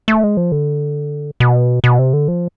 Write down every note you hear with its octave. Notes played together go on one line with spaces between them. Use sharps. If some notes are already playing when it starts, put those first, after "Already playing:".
A3
G#3
F3
D3
B2
B2
C3
D3
F3